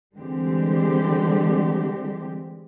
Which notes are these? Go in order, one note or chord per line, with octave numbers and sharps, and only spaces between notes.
D3 E3 G3 G#3 C4 G4